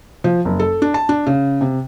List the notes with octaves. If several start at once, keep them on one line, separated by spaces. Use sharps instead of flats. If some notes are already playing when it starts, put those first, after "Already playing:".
F3
F#1
A4
D4
A5
D4
C#3
C3